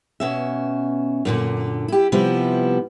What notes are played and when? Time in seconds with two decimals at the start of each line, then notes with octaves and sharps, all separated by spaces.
0.20 B2 C#4 E5
1.25 F#2 A#2 D3
1.88 E4 G4
2.12 C3 F3 G3 B3 E4